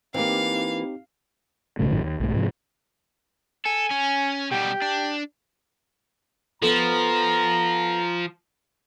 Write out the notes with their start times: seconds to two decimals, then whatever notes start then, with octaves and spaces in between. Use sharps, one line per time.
0.14 E3 A#3 C4 D#4 G4 F5
1.79 B1 G#2 C#3 A3
1.90 G#1 F#2 A2 D#3
2.03 D#2
2.20 B1 G#2 A3
2.34 G#2 C3 F3
3.66 A4 G#5
3.91 C#4
4.52 B2 G3 G4
4.82 D4
6.62 F3 B3 A4 A#5